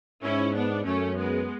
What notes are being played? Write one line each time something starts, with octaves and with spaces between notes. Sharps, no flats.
G#2 C#4 E4
B3 D4
F#2 A3 C#4
G#3 B3